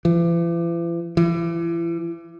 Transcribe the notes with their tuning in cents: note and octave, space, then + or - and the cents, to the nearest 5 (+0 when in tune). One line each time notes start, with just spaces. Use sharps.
E3 +45
E3 +35